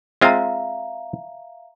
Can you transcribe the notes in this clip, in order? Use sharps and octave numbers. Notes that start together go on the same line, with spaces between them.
G#3 C4 F4 E5 F5 A#5